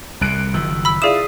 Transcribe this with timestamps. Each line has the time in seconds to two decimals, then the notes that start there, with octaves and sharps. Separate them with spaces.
0.21 C2 C3 F#6 D7
0.54 F#1 D#3 F3 E6
0.85 B5 E6 B6
1.02 E4 F4 G#4 D5 D#6 C7 D#7 E7